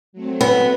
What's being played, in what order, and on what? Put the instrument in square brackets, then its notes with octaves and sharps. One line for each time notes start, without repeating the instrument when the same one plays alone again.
[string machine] F#3 A3 C4
[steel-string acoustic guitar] B3